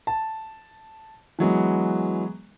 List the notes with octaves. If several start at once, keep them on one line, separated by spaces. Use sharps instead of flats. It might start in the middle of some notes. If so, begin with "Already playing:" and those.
A5
E3 F#3 G#3 B3